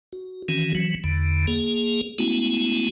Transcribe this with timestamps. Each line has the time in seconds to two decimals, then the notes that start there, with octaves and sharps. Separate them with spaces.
0.13 F#4
0.48 D#3 E3 C#4 F#4
0.75 E3 F#3
1.04 E2 D3
1.47 A#3 G#4
2.18 G#3 A3 B3 C#4 E4 F#4